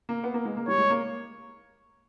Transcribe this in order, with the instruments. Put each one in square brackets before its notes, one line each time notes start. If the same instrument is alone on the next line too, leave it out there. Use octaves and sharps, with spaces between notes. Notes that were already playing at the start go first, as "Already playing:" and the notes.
[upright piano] A#3
B3
A#3
G#3
A#3
[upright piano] G3 [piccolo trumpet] C#5
[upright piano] G#3
A#3